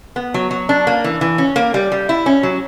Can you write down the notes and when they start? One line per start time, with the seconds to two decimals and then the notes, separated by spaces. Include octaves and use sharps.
0.16 B3
0.34 F#3
0.51 F#3
0.69 D4
0.87 A#3
1.04 E3
1.21 E3
1.38 C#4
1.56 A#3
1.74 G3
1.92 G3
2.09 E4
2.26 C#4
2.43 F#3